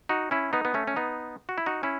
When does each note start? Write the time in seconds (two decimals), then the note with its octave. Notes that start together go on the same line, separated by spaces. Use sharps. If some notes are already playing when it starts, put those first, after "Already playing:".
0.09 D#4 F#4
0.31 C#4 E4
0.53 B3 D#4
0.65 B3
0.74 A3 C#4
0.87 C#4
0.96 B3 D#4
1.49 F#4
1.58 E4
1.66 D#4 F#4
1.83 C#4 E4